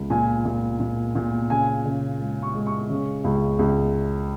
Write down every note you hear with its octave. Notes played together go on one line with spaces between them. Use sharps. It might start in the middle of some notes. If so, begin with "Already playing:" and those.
Already playing: C#2
A#2 G#5
A#2
A#2
A#2
C#3 G#5
C#3
G#3
C#6
G#3
C#6
C#3
C#2
C#2